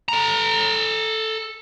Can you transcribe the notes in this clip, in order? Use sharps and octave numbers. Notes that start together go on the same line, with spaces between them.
A4 A#5